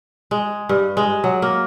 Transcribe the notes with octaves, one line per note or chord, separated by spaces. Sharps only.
G#3
G2
G#3
F#3
A#3